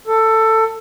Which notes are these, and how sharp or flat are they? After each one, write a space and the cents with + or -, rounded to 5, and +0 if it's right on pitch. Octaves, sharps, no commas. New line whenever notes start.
A4 +15